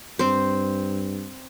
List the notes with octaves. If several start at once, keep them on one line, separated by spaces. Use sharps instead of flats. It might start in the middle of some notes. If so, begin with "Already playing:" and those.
G2 C4 C5